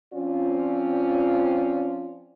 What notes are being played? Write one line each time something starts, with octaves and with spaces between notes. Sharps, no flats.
F3 C4 C#4 F4 D5